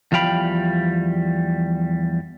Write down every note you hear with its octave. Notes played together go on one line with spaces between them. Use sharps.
E2 F3 G3 F5 G5 B5